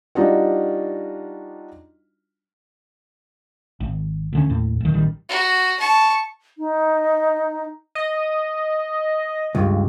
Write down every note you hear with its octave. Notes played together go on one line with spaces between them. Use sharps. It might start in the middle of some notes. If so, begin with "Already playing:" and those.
G3 D4 D#4 F4 F#4
G#1
D2 D3 C#4
D#2 A2
D1 D#3
A1 D#3 G3
F#4
A5 C#6
D#4
D#5
C#2 G2